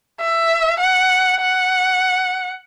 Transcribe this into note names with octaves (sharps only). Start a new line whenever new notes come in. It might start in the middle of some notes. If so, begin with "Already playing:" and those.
E5
F#5
F#5